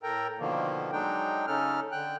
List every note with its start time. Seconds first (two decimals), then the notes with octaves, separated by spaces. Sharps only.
0.03 A2 A4 A#4 G5 A#5
0.39 B2 D3 D#3 F3 A#3
0.92 F#3 G#3 D4 D#4 G5
1.47 C#3 C#4 D#4 A4 F6
1.92 D3 G5 F#6